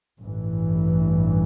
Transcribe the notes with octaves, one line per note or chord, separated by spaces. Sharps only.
A1 G2 E3